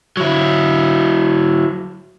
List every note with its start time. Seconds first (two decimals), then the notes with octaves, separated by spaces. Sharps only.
0.17 F#3 E4